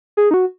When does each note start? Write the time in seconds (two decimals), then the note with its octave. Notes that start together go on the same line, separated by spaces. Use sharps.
0.17 G#4
0.31 D#4
0.34 F#4